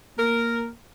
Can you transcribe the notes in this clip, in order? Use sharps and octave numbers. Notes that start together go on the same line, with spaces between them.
A#3 A#4